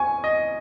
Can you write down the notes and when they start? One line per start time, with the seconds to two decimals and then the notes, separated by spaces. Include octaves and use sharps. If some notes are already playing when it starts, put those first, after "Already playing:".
Already playing: G#5 C#6
0.24 D#5